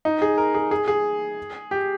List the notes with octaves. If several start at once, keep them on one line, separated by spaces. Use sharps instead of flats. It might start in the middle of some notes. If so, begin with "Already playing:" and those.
D#4
G#4
A#4
G#4
G#4
G#4
G4